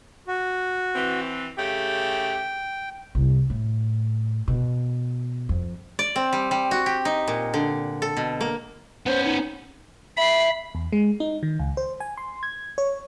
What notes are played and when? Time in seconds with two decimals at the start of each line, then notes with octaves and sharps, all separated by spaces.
0.28 F#4
0.96 E3 C4
1.58 C#3 A3 G4 G5
3.15 C2
3.50 A2
4.48 B2
5.49 F2
5.99 D5
6.16 C4
6.33 G3
6.51 G3
6.71 F#4
6.86 G4
7.05 D#4
7.28 A#2
7.54 D3
8.02 A4
8.17 B2
8.41 A#3
9.06 B3 C#4 C5
9.25 D#4
10.17 E5 B5 C7
10.75 E2
10.93 G#3
11.20 D#4
11.43 D#3
11.60 C#2
11.77 C5
12.00 G#5
12.17 C6
12.43 G#6
12.78 C#5